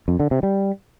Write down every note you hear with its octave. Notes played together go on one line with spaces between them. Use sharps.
F2
D3
C3
G3